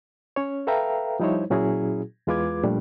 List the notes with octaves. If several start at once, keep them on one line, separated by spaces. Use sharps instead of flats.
C#4 C#5
A4 B4 E5 F5 G5 A#5
F3 G3 D#4 E4 C5 C#5
A#2 F#3 C#4 E4 F#4 G#4
E2 G#3 F4 B4 D6 G#6
A#2 F3 G3 A3 D4